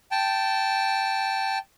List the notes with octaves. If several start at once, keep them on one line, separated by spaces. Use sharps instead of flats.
G5 A5